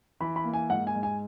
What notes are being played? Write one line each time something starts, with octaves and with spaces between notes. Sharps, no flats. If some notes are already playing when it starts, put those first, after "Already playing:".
E3 B5
B5
A#3
G#5
G#2 F#5
G#5
G#2
G#5